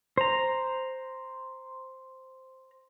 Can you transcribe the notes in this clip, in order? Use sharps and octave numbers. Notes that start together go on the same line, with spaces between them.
C5 A#5